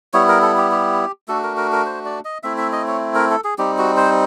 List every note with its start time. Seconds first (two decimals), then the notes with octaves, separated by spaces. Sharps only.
0.13 G3 B3 E4 C#5
0.28 A#4
0.42 A4
0.57 G4
0.71 G4
1.28 A3 D4 F#4 A4
1.43 A#4
1.57 A#4
1.72 A#4
1.86 C5
2.05 D5
2.25 D#5
2.43 A3 C4 E4 E5
2.58 E5
2.72 D#5
2.87 C#5
3.15 A#4
3.31 A4
3.44 G#4
3.58 G3 C4 D#4 G4
3.78 F#4
3.97 C5